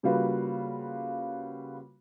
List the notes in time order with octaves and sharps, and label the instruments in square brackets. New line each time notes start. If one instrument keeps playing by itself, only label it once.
[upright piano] C#3 G3 A#3 F4 F#4 B4